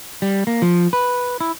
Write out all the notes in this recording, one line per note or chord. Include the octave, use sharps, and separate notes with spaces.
G3
A#3
F3
B4
E4